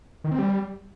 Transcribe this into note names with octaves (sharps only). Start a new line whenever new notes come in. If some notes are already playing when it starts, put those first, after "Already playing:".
D#3
C4
G3